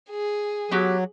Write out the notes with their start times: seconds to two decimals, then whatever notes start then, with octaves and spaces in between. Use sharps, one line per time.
0.10 G#4
0.71 F#3 B3 F#4 G4